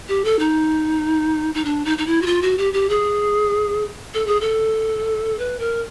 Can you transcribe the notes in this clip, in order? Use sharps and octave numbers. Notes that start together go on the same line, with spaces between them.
G4
A4
D#4
D#4
D4
D#4
D#4
E4
F#4
F4
F#4
G4
G4
G#4
A4
G#4
A4
B4
A#4